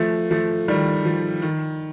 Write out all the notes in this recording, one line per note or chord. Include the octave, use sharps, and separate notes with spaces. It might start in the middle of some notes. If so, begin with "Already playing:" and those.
Already playing: F3 A3
F3 A3
D#3 G3
F3
D#3